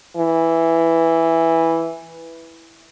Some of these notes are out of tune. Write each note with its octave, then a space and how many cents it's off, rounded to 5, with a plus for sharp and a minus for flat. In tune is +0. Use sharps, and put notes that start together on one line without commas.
E3 +0